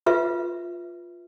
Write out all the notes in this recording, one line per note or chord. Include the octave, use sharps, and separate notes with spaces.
F4 B4 E5